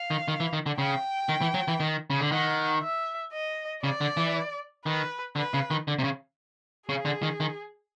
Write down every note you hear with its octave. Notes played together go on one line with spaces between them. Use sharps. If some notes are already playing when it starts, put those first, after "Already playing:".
Already playing: F5
D#3
D#3
E3
D#3
D3
C#3 G5
D#3
E3
F#3
E3
D#3
C#3
D3
D#3 F#5
E5
D#5
C#3 D5
D3
E3
D#3 B4
D3 B4
C#3
D#3
D3
C3
C#3
C#3 G#4
D3
D#3
D#3